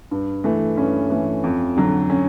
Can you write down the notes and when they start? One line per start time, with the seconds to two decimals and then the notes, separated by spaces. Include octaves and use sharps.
0.11 G2
0.44 E3 A3
0.77 G2 C#4
1.10 E3 A3
1.44 F2
1.76 D3 F#3
2.10 C#4